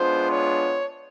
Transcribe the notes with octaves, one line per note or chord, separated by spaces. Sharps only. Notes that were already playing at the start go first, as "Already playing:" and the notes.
Already playing: G#3 B3 D4 F4 C5
C#5